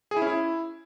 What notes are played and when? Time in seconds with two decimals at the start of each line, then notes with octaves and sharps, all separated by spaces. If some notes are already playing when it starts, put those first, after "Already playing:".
0.11 G#4
0.17 E4
0.22 C#4
0.27 E4